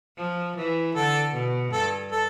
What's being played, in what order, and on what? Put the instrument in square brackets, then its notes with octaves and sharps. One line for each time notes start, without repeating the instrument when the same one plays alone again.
[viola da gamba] F3
E3
[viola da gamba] D3 [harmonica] A4
[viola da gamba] B2
[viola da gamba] G2 [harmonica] A4
[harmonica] A4